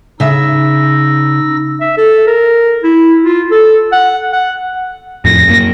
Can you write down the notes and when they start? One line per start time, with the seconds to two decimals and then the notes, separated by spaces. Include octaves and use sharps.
0.20 C#3 D#4 E5 E6 A#6
1.81 E5
1.97 A4
2.27 A#4
2.83 E4
3.25 F4
3.51 A4
3.92 F#5
4.32 F#5
5.25 F2 A2 A#6
5.49 F#2 A#3